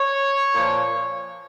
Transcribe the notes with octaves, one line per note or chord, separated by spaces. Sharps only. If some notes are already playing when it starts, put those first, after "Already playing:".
Already playing: C#5
A#2 F3